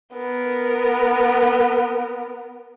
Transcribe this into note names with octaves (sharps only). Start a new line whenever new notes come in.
B3 A#4